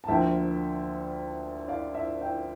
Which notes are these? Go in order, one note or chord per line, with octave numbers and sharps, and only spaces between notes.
A5
D2 D3 F3 A#3 E5 G5
D5 F5
E5
E5 G5